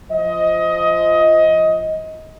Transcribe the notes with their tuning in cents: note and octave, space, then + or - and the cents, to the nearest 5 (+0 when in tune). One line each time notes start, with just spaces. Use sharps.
F3 -10 D#5 +20